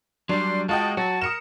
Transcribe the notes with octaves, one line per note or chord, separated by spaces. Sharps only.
F#3 G3 D4 C6
G#3 F4 F#4 D#5 G5 A5
F#3 F#4 A5
A#4 D#6 C#7 E7